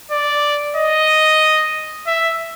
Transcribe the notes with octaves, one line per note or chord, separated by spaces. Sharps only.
D5
D#5
E5